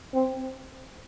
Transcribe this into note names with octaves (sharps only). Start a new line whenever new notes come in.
C4